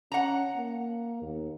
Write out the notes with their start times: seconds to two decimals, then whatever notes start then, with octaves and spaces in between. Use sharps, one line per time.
0.12 C#4 F#5 A#5
0.56 A#3
1.22 D#2